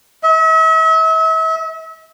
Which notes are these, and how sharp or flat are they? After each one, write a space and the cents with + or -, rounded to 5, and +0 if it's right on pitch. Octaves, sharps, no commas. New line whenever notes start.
E5 -40